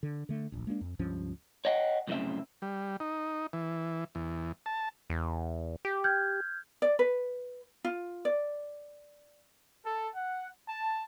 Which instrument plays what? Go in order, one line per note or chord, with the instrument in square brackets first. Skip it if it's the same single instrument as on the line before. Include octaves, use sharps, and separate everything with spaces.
[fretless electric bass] D3
D3 A3
D1 A#1
G#3 A#3 C#4 D4
F2
C#2 G2 F3 C#4
[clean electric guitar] C#5 D#5 F#5 G5
C2 F#2 A2 C#3 C4 E5
[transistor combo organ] G3
D#4
E3
E2
A5
[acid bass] E2
G4
[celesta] F6 G6 G#6
[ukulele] D5
B4
F4
D5
[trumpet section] A4
F#5
A5